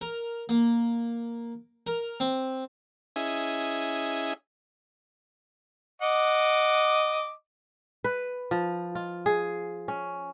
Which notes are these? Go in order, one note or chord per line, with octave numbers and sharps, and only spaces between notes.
A#4
A#3
A#4
C4
C#4 E4 G#4 D#5 E5 G#5
D#5 F#5 D6
B4
F3
F4
G#4
C#4